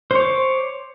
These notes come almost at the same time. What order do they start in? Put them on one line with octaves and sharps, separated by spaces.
C5 C#5 D6